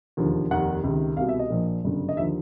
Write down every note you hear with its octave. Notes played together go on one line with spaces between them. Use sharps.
E1 D#2 D3 F3
F1 D#2 D#3 F#5
C#2 C3 D#3
C2 B2 F5
E5
D#5
A#1 A#2 F3
G1 F#2 C#3
D#5
D#2 D3 F3 E5